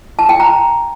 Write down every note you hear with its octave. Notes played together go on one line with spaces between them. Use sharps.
A5
G5
A#5